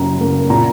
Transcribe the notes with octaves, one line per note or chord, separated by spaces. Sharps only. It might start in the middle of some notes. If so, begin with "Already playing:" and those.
Already playing: F#2 C#3 A#3 A#5
C#3 A#3
A#2 A#5